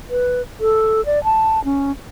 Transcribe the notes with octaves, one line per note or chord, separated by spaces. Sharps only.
B4
A4
D5
A5
C#4